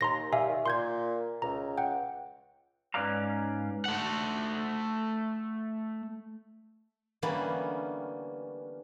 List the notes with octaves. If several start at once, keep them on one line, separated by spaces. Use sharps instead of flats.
D#2 A#5 C6 A#6
G3 E5 F5 G#5
D#3
A#2 C6 G6 G#6
C#2 A#5
F#5 G5
G#2 C#4 B4 D5 F5 A#5
A3 F#5
D3 E3 G3 A#3 B3 C#4